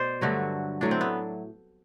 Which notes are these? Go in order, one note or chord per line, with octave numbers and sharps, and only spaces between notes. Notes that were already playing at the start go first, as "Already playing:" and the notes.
Already playing: B2 C5 D5
G2 D3 F#3 A3 F#4
A2 F#3 A3 D4
C4
B3